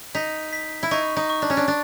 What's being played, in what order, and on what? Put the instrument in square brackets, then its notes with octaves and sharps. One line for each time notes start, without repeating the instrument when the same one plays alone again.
[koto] D#4 [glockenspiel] B6
[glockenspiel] B6
[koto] E4
[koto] D#4 [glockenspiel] C#6
[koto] D#4
[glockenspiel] C#6
[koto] D4
C#4
D4
[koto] D4 [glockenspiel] A6